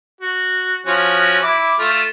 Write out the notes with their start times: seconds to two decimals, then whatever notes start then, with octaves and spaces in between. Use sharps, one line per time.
0.21 F#4
0.86 F3 C#4 F#4
1.43 E4 D6
1.79 A3 F4